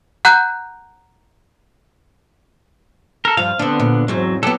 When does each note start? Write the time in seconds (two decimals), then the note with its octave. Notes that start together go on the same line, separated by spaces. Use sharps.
0.25 F#5 A#5 F#6 G6
3.25 A4 A#4
3.37 G2 F3 F5
3.59 D3 B3 C4 D4
3.80 A#2
4.08 E2 G#2 F#3 C4
4.43 F#3 B3 G4 A4